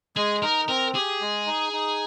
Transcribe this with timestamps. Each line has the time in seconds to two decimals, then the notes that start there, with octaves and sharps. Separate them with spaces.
0.16 G#3 G#4
0.42 D#4 A#4
0.68 C4 A#4
0.94 G4 G#4
1.21 G#3
1.47 D#4
1.73 D#4